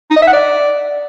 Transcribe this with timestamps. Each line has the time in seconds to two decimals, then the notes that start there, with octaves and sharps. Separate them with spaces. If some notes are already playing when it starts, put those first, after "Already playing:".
0.10 D#4
0.16 D#5
0.22 E5
0.27 F#5
0.33 D5